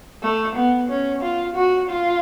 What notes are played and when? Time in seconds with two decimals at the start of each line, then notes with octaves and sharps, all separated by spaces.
0.22 A3
0.56 B3
0.88 C#4
1.21 F4
1.55 F#4
1.89 F4